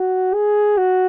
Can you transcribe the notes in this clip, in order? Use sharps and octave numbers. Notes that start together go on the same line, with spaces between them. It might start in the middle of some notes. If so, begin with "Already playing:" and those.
Already playing: F#4
G#4
F#4